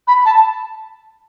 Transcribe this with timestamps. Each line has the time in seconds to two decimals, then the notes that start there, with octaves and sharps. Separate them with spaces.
0.08 B5
0.25 A5